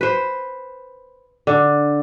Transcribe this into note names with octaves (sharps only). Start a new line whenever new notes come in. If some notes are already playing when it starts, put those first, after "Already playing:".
B4 C5
D3